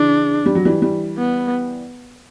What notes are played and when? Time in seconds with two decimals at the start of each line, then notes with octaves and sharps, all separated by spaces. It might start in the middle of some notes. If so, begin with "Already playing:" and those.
Already playing: C#3 E3 D4
0.46 G3
0.55 F#3
0.65 E3 G3
0.82 E3 G3
1.18 B3